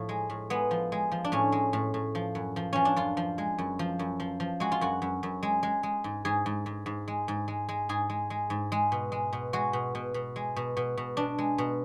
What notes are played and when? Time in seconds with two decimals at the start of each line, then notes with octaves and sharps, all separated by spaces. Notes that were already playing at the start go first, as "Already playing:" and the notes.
Already playing: A2 F3
0.09 G#3
0.30 A2
0.50 G#3 B3
0.71 F3
0.92 G#3
1.12 F3
1.24 D4
1.32 A2 C#4
1.52 G#3
1.73 A2
1.94 A2
2.15 F3
2.35 F#2
2.56 F3
2.73 F3 C#4
2.85 D4
2.96 F#2 F4
3.17 F3
3.38 G#3
3.58 F#2
3.79 F3
3.99 F#2
4.20 F3
4.40 F3
4.60 G#3 F#4
4.72 F4
4.81 F#2 F#4
5.02 F#2
5.23 F#2
5.43 G#3
5.63 G#3
5.83 G#3
6.04 G#2
6.25 G#2 G#4
6.46 G#2
6.66 G#2
6.86 G#2
7.08 G#3
7.28 G#2
7.48 G#3
7.69 G#3
7.89 G#2 G#4
8.10 G#3
8.30 G#3
8.50 G#2
8.72 G#3
8.92 B2
9.12 G#3
9.33 B2
9.53 G#3 F#4
9.73 B2
9.95 B2
10.14 B2
10.36 G#3
10.56 B2
10.77 B2
10.97 B2
11.17 B2 D4
11.38 G#3
11.58 B2